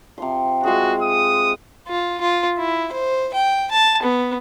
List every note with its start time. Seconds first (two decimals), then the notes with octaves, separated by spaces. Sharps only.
0.18 C3 F3 C6
0.64 G#3 F4 F#4 G#4
1.02 D#6
1.88 F4
2.21 F4
2.58 E4
2.92 C5
3.34 G5
3.71 A5
4.03 B3